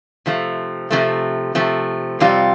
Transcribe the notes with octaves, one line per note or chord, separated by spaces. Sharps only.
C3 F3 A3
C3 F3 A3
C3 F3 A3
F2 C3 G3 C4 F4